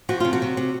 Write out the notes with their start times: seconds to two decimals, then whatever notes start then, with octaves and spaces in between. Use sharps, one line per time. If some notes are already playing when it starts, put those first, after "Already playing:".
0.09 F3 F#4
0.20 C3 F4
0.33 F#4
0.42 C3
0.57 C3